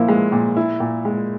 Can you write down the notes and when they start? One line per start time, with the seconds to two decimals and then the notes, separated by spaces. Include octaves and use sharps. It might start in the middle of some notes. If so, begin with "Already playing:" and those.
Already playing: A#2 F3 A#3 E4
0.08 G#3
0.32 A#2
0.57 E4
0.80 A#2
1.05 G#3